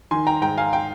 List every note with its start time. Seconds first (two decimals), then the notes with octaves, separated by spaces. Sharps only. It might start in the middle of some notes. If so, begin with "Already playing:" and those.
0.11 D#3 G#5 C6
0.27 G5 A#5
0.42 G#2 G5 A#5
0.58 F5 G#5
0.73 G5